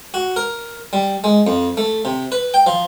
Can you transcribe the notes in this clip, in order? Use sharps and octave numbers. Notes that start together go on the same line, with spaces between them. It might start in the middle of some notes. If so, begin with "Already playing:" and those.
F#4
A#4
G3
G#3
F2
A3
C3
B4
G5
F3